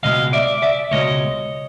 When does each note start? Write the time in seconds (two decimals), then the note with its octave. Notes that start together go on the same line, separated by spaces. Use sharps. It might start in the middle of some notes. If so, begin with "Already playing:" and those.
0.03 C#2 B2 G#3 D#5 F5
0.33 D5 E5
0.62 D5 E5
0.91 C#2 B2 G#3 C#5 D#5